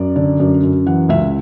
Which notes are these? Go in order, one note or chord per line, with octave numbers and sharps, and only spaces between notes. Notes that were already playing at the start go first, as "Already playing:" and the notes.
Already playing: F#2 D5
D3
F#2
F#2
E3 F#5
C#2 E5